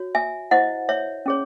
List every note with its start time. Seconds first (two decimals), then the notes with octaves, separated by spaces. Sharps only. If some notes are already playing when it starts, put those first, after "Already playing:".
Already playing: F#4 C#5
0.15 E5 G#5
0.51 E4 C5 D#5 F#5
0.89 C#5 E5
1.26 C#4 G#4 C#5